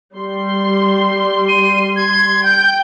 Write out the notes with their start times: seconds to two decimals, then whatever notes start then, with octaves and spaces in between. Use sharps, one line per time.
0.15 G3 C6
1.49 D#7
1.96 G#6
2.44 G5 G6